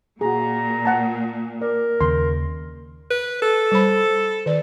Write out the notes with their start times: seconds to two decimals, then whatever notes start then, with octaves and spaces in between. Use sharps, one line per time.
0.21 A#2 F#4 G#4 A#5
0.85 F#5 A5
1.61 A#4 D5
2.01 D#2 C#3 C6
3.10 B4
3.42 A4
3.72 G3 C5 B5
4.46 D#3 D5